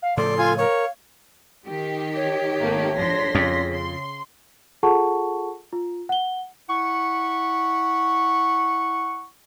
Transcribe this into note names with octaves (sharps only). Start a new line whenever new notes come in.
F5
A2 C#3 F3 A4 D5 C6
F4 G#5
A#4 C#5 F5
D#3 G4
C#5
G#1 A3 A#3
F3 D4 C6 A#6 B6
F2 C#3
C6
F4 G#4 A4 F#5 A5 C#6
F4
F#5 G7
E4 F#5 C#6